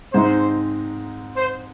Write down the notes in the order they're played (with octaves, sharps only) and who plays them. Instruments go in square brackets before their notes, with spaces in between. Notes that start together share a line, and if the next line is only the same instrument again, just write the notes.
[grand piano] G#2 G#3 C4 D#4 [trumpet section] C5
[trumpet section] C5